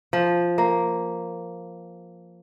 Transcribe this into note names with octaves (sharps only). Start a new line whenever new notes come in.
F3
A#3